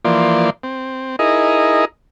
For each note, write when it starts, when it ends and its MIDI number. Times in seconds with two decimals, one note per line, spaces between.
0.05 0.50 52
0.05 0.50 53
0.05 0.50 58
0.05 0.50 74
0.05 0.50 84
0.63 1.16 60
1.19 1.85 63
1.19 1.85 64
1.19 1.85 68
1.19 1.85 70
1.19 1.85 75